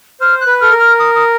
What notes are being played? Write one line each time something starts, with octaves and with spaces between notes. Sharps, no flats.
C5 F6
F#6
B4
A4 F6
A#4
F6
D#6
D#6